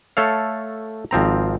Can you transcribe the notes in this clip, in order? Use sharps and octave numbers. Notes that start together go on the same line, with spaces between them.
A3 A4 C#5 F5
G#1 F3 C4 A#5